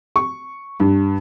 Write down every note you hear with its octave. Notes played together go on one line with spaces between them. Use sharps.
C#6
G2